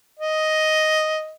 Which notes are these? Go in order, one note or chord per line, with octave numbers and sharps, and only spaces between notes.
D#5